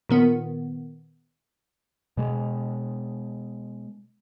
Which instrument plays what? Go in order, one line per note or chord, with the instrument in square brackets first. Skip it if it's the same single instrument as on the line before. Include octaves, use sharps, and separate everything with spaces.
[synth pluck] A#2 D#3 B3
[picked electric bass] B2 G#3